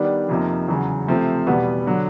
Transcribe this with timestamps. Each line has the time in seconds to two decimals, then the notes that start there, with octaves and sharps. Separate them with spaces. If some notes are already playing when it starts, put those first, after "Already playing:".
Already playing: D#3 G3 B3 D4
0.29 F2 C3 F3 A#3 D#4
0.68 E2 C#3 F#3
1.08 C3 F3 A3 C4
1.47 E2 B2 G3 B3
1.86 D3 F#3